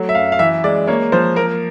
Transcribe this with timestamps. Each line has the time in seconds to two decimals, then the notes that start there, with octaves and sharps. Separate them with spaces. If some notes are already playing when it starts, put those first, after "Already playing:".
Already playing: F#3 A3
0.09 E5
0.15 F#2 F5
0.32 F5
0.39 E3 E5
0.64 G#3 D5
0.87 A#3 C#5
1.12 F3 C5
1.36 A#3 A#4